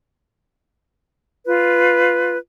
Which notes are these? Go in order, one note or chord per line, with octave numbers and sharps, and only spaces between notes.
F4 B4